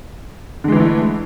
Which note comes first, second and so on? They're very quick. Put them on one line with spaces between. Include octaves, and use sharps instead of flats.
D3 G#3 E3 E4 A3